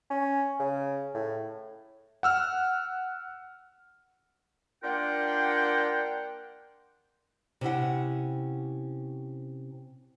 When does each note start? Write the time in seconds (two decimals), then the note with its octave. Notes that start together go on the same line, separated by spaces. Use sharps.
0.10 C#4
0.60 C#3
1.14 A2
2.23 F#5 E6 F6
4.83 A#3 D4 F4 A#4 F#5 G5
7.61 C3 C#4 E4 F#5